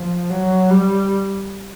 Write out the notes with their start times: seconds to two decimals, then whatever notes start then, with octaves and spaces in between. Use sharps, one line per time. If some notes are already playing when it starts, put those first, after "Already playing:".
Already playing: F3
0.30 F#3
0.70 G3